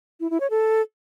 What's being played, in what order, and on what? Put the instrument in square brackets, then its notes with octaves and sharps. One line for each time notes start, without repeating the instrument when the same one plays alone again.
[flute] E4
E4
C#5
A4